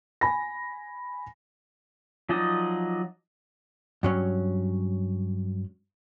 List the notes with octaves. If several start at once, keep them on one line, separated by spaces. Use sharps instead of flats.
G#5 B5 A#6
F3 F#3 D#4 D5 D#5
G2 F#3 C#4